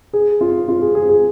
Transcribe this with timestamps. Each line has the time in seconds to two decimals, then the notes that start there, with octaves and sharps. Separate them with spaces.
0.13 G#4
0.41 F4
0.68 F4
0.81 G#4
0.95 G#4
1.09 G#4